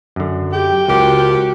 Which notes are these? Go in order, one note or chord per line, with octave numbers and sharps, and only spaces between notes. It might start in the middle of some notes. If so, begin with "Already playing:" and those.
F#2 D3
G4 G5
C#2 F3 F#4 G4 A#4 F#5